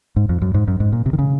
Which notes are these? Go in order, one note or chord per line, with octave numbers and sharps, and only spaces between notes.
G#2
F2
F#2
G#2
F#2
G#2
A#2
C3
D#3
C#3